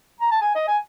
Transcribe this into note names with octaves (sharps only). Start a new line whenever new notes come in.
A#5
A5
G#5
D#5
G#5